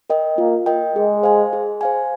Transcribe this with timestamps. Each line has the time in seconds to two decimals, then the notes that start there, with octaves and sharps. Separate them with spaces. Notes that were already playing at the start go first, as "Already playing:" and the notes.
0.10 A#4 D#5 G5
0.38 A#3 F4
0.66 A#4 D#5 G5
0.96 G#3 G#4
1.23 C5 F5 G#5
1.53 G#4
1.81 C5 F5 G#5